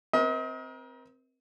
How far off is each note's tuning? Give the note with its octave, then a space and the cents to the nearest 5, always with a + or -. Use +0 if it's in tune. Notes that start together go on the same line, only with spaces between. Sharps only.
C4 -5 A#4 +35 D#5 +40